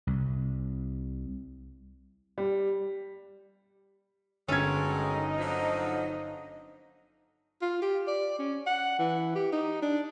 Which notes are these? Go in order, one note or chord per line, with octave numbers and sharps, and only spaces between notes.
C2
G3
G1 D#3 F#3 G#3 C#4 A4 G#6
D#4 D#5
D3 F3 F#3
F4
G4
D5
C#4
F#5
E3
G4
D#4
D4